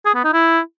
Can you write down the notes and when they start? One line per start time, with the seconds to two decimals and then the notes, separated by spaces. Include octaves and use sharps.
0.06 G#4
0.15 B3
0.24 D#4
0.33 E4